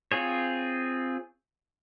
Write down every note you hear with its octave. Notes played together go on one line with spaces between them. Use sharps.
C4 F4 G#4 C#5